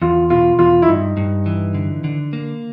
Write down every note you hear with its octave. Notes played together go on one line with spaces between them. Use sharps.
E2 F4
B2 F4
E2 F4
E4
G2 D#4
G2
E3
D3
D3
A#3